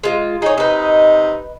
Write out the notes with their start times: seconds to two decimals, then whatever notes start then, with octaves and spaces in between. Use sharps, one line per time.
0.04 G#3 F4
0.42 D#4 G#4 C#5
0.58 C3 D#4 B4 D#5